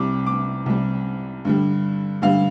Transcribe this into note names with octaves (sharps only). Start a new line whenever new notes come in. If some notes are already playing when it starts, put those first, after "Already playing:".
Already playing: C2 C3 G3 D6
D6
C2 C3 G3
G2 D3 G3
G2 D3 G3 F5